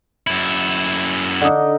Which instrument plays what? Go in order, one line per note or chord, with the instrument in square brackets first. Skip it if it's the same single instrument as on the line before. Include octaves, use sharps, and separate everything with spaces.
[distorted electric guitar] F#2 E4
[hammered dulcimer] D3 D#4